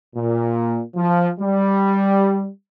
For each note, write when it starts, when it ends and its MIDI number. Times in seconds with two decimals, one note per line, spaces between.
0.16 0.82 46
0.95 1.31 53
1.40 2.48 55